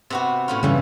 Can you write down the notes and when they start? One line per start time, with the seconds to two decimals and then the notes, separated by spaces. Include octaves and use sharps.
0.10 C3 B3 F#4
0.48 A2 C#4 F4
0.63 G2 C#3 E3 G3